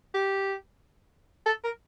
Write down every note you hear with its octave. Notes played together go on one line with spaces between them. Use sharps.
G4
A4
A#4